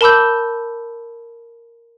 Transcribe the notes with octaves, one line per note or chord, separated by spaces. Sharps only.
A#4 A5 B5 D6 E6 G6